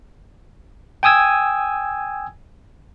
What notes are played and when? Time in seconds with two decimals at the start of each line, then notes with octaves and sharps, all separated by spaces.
1.03 G5 G#5 D#6 E6 G#6